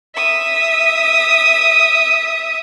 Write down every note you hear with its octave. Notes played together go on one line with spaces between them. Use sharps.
E5 D#6